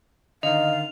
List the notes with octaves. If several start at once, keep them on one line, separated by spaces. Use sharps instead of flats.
D3 D#3 D#5 F5 F7